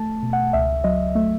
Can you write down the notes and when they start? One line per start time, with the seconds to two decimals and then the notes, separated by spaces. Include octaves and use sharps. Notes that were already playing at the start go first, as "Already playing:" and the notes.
Already playing: A3 A5
0.23 B2
0.33 F#5
0.53 C#2 E5
0.84 F#3 D#5
1.15 A3 E5